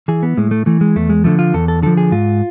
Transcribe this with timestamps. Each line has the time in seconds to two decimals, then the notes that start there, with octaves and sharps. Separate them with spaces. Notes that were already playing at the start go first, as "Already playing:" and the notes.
0.08 E3 G#4
0.23 B3
0.37 A2 G#3
0.51 A3
0.66 E3 A3
0.81 G#3
0.96 E2 A3
1.10 G#3
1.24 D3 F3 A3
1.39 F4
1.54 E2 A4
1.68 A4
1.83 D3 F3 A4
1.97 G#4
2.12 G#2 F4